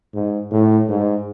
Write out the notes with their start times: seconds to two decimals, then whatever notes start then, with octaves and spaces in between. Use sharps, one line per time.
0.14 G#2
0.51 A2
0.89 G#2